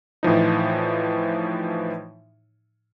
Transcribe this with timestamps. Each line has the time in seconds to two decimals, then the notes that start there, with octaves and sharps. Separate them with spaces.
0.23 A2 E3 F3 D#4